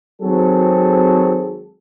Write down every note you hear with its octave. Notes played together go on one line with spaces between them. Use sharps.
G#1 F#3 C4 G#4 A4